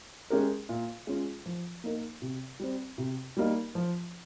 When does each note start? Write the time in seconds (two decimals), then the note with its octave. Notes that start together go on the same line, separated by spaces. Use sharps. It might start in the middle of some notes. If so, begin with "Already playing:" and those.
0.30 G#3 C#4 G4 A#4
0.69 A#2
1.07 G#3 C#4 F4
1.46 F3
1.84 A#3 D#4 A#4
2.22 C3
2.60 G3 C4
2.98 C3
3.37 G3 A#3 D#4
3.75 F3